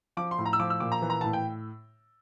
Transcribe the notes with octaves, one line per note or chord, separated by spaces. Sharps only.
F3 D6
C6
A2
A#5
E6
F3 D6
E6
A#2 D6
A#5
E3
A#5
A2 A5
G5